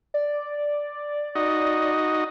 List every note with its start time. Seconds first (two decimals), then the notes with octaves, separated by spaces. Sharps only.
0.14 D5
1.35 D#4 F#4 D#5